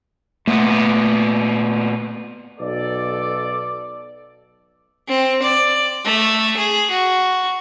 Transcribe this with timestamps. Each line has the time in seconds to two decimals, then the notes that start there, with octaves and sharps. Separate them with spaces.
0.47 A#2 A3 B3
2.59 B1 A4 D5
5.08 C4
5.42 D5
6.04 A3
6.56 G#4
6.90 F#4